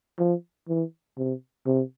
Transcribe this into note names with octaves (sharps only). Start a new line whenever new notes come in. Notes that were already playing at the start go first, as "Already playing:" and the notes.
F3
E3
C3
C3